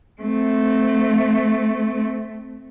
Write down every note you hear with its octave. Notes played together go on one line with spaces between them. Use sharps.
A3 C4